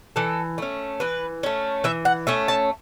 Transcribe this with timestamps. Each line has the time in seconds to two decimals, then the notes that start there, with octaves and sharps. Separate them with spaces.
0.16 E3 A4
0.58 A3 C#4
1.00 E3 B4
1.43 A3 C#4
1.84 E3 E5
2.05 F#5
2.27 A3 C#4 E5
2.48 A5